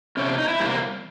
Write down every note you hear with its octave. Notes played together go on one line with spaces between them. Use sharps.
E2 C3 C#4
D4
D#4
E4
E2 C3 G3 A#3